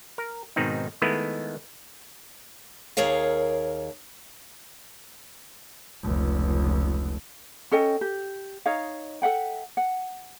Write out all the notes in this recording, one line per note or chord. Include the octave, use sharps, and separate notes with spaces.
A#4
G#2 B2 D#3 C4 D#4
D#3 G#3 A3 B3 E4 B4
D#2 G#4 A#4 C#5 F5
F1 C#2
C#4 A4 D#5 G5
G4
D#4 C#5 D#5 F5
A4 E5 F#5 G5
F#5